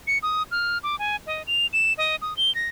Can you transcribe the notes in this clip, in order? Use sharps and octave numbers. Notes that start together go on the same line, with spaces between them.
C#7
D#6
F6
D6
G#5
D#5
F7
E7
D#5
D#6
G7
A#6